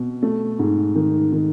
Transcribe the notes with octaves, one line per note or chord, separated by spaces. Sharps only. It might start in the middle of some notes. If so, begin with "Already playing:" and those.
Already playing: B2
A3
G#2
D#3
D#3